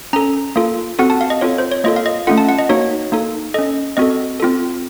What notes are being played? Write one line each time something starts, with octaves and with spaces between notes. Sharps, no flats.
C#4 A4 A#5
A#3 F4 A4
C4 F#4 A4 F#5
A5
F5
D#5
C4 F4 A4 C#5
C5
C#5
A#3 F4 A4 D#5
F5
D#5
A3 C#4 F4 A4 F#5
A5
F#5
D#5
A#3 D#4 F#4 C#5
A#3 D#4 A4
C#4 A4 D#5
C4 F#4 A4 D#5
C4 F4 A4